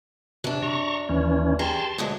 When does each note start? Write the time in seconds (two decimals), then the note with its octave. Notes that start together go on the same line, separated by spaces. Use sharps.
0.44 F#2 C3 D4
0.62 A#5 C#6
1.09 D#2 E3 C#4
1.59 G4 G#4 A#4 A5 C6
1.98 D2 D3 F#3 G#3